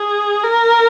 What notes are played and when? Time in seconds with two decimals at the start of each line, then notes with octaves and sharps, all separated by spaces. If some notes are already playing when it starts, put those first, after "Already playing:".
Already playing: G#4
0.43 A#4